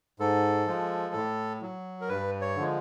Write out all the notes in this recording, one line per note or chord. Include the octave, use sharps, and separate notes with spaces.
G#2 A4
F3 G#3
A2
F#3
A#4
G2 B4
C#5
D3 F3 G#3